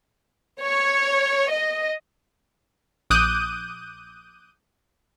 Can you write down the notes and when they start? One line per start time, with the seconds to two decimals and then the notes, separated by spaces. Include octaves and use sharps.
0.63 C#5
1.51 D#5
3.10 A#1 D6 D#6 F#6 G6 D#7